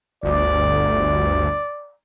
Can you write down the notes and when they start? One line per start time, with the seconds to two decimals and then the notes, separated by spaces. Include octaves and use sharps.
0.23 G1 D2 D5